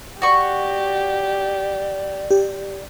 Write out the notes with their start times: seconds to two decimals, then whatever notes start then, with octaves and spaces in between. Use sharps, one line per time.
0.22 F#4 G4 D5 C#6
2.31 G4